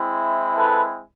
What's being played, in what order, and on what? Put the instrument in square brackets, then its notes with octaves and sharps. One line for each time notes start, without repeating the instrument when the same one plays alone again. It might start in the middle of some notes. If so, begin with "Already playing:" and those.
Already playing: [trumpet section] G#3 C4 E4
A4 B4